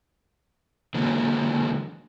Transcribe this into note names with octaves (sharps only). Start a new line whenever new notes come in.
D3 E3 F#3 G#3 A#3